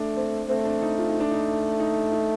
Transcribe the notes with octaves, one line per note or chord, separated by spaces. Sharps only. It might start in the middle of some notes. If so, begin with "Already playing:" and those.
Already playing: A3 D4
C4
A3 C4
D4
D#4
F4
D#4
D4
D#4
D#4
D#4